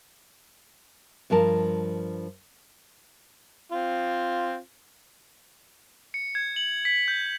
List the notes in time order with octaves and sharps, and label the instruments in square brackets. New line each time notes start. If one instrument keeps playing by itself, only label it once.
[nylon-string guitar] G2 F3 A#4 A5
[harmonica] C4 F4
[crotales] C#7
G#6
F#7
B6
G6